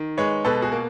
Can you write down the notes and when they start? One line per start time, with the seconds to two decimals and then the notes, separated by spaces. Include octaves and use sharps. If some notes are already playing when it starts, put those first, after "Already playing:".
Already playing: D#3
0.17 G#3 B4 C#5
0.45 B2 A4 B4
0.62 F#4 G#4
0.72 A#3